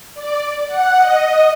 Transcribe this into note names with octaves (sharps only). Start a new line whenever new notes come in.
D5
F#5
D#5